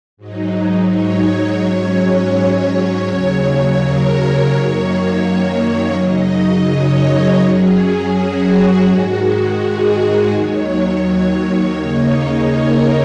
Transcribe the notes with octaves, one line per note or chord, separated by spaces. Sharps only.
G#2 F#3 D#4
C#5
G#2 F#3 C#4
D#2 C#3 F#3 C#5
A#4
C#5
F#2 D#3 F#3 A#3
F#2 C#3 F#3 D#4 D#5
C#5
F#2 F#3 C#4 G#4
F#4
G#2 D#3 G#3 F#4
G#4
D#2 D#3 F#3 C#5
C#5
D#2 C#3 A#3 D#4
A#4